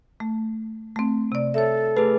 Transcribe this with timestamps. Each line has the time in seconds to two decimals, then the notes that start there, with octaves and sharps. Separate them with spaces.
0.20 A3
0.96 A3 C4
1.32 C3 D5
1.54 A4 C#5 E5
1.97 A3 G#4 B4